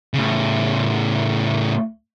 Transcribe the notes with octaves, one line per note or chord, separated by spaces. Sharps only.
A2 C#3